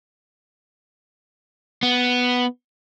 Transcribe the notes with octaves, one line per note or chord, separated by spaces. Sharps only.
B3